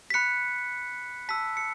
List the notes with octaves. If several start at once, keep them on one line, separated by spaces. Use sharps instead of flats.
B6
B5 F#6 C#7
A5 E6 B6
C#7